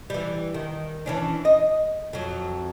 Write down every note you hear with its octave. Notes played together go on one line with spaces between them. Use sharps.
E3 G3
D#3
E3 C#4 D4
D#5
F2 F#3